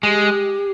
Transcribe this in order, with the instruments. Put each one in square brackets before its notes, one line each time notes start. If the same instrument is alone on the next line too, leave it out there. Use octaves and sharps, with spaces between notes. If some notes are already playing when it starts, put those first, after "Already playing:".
[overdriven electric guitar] G#3 [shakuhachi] G4